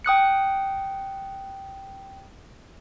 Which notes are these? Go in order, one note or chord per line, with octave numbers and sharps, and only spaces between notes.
G5 D#6 F#6 C#7